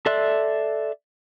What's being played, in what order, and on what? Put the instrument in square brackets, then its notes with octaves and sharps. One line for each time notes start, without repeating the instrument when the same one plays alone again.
[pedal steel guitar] A4 D5 E5 C6 F#6